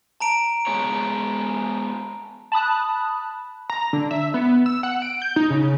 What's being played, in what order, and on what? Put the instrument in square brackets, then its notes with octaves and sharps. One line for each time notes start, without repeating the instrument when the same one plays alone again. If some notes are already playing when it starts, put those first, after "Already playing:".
[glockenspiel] A5 A#5 D7
[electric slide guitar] G#3 B3 C#5
[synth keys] A5 B5 D#6 F#6
[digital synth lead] A#5
D3
E5
B3
E6
F#5
D7
G6
D#4
C#3